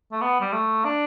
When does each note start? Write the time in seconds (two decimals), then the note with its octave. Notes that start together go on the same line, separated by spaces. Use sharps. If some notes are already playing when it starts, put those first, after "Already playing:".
0.12 A3
0.21 B3
0.41 G3
0.53 A3
0.85 D4